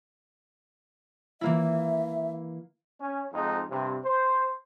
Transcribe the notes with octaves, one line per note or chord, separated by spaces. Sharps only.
E3 A#3 E4 E5
C#4
F2 G#2 D#4
G2 C3
C5